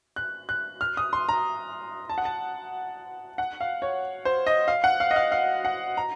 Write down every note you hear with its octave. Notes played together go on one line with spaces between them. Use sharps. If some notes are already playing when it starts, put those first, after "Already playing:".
F#6
F#6
F6
D#6
C6
A#5
A5
F#5
A5
F#5
F5
C#5
C5
D#5
F5
F#5
F5
D#5
F5
F5
F#5
A#5